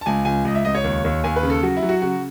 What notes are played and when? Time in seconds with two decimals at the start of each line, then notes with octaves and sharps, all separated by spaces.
0.01 A5
0.06 C#2 G#5
0.25 C#2 G#5
0.45 C#2 D#5
0.55 E5
0.65 C#2 D#5
0.75 C#5
0.84 D#2
1.04 D#2
1.24 D#2 G#5
1.36 B4
1.43 C#3
1.50 A4
1.63 F#3 F#4
1.76 E4
1.83 F#3
1.89 F#4
2.02 C#3 F#4